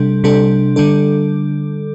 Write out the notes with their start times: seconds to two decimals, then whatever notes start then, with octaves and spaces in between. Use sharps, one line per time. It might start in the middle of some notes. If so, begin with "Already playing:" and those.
Already playing: C3 G3 D4 A4
0.24 C3 G3 D4 A4
0.76 D3 G3 D4 A4